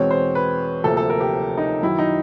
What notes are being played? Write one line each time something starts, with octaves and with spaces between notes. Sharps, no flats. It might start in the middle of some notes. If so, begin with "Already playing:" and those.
Already playing: E2 B2 G#3 C4 C#5
C5
B4
D2 C3 F3 A#3 A4
A4
A#4
G4
D#4
F#2 D#3 F#3 E4
D#4